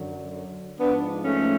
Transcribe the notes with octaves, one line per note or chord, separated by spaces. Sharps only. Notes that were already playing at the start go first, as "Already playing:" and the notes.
Already playing: F#2 D3 F#3
G#2 F3 B3 D4
A3 C#4